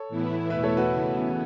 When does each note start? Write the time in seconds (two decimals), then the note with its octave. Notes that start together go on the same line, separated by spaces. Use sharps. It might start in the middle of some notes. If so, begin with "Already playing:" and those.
Already playing: A4 C#5
0.09 A2 E3 B3 E4
0.49 E2 B2 A3 E4 B4 E5
0.63 A4 C#5
0.77 F#4 B4
0.91 C#3 E3 B3